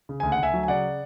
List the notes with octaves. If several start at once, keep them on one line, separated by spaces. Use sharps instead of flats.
C#3
D2 G#5
F#5
D2 E5 G#5
F#3
G#5
C#3 D5 F#5